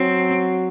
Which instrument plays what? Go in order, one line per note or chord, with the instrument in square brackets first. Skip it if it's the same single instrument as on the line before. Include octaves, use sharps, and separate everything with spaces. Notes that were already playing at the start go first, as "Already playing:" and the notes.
Already playing: [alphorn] F#3 [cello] C4